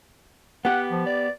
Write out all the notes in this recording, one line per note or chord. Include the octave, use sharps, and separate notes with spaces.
B3 G4 F#5
F3
D5